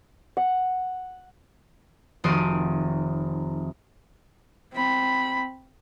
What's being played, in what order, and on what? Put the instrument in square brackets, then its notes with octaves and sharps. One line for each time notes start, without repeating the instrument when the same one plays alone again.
[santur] F#5
[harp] F1 D#3 F#4 C6 D#6 D7
[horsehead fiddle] C4 B5